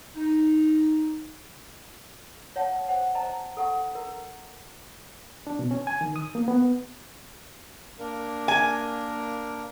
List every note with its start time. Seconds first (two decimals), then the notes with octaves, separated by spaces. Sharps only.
0.16 D#4
2.56 C#5 F5 F#5 A5
2.89 C5 F#5 G#5
3.15 C5 D#5 A5 A#5
3.57 A4 F#5 C#6
3.95 A#4 A#5
5.47 D4
5.59 B2
5.71 C#4
5.87 G#5
6.01 D#3
6.16 D#6
6.35 A#3
6.48 B3
7.99 A#3 D4 A#4
8.48 G#5